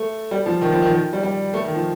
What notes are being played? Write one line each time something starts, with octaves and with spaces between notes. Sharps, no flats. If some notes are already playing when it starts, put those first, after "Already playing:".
Already playing: A3
G3
F3
D#3
F3
D#3
D#3
G3
G3
A3
D#3
F3